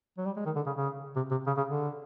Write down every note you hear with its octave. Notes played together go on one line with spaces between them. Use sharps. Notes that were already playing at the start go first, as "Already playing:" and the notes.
F#3
G3
G#3
D#3
D3
C#3
C#3
C3
C3
C#3
C#3
D3